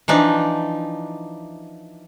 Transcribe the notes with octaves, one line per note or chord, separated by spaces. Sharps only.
E3 F3 D4 D#4